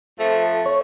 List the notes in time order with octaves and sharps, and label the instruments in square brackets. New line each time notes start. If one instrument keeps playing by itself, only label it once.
[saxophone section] F2 F3 A3
[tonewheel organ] C#5